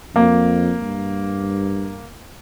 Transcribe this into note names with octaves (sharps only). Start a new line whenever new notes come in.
F2 A#3
G2